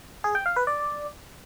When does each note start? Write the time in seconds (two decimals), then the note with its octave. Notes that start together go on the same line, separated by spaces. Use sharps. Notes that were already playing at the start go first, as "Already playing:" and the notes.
0.24 G#4
0.35 G5
0.46 F5
0.56 B4
0.67 D5